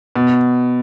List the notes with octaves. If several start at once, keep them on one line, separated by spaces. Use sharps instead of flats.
B2